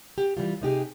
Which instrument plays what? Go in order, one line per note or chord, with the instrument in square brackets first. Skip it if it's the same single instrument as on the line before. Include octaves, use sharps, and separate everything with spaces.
[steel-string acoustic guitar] G4
E3 G3 F4
C3 D#4 G4 G#4